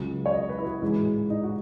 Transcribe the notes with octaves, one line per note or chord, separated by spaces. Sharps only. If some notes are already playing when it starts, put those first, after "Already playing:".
Already playing: C#2 C#3 F#3
C#5
D#5
B4
E4
F#4
A1 G#2 E3 G#3 E4
D#4
F#4